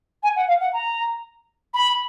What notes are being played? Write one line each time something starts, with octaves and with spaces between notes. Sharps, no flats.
G#5
F#5
F5
F#5
A#5
B5